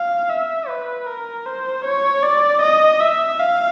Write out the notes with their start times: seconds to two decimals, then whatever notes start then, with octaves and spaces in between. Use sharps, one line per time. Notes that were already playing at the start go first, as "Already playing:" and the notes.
Already playing: F5
0.30 E5
0.68 B4
1.07 A#4
1.46 C5
1.85 C#5
2.23 D5
2.62 D#5
3.01 E5
3.39 F5